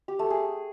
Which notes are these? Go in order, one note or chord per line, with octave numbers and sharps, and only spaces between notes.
G4
A3
G#4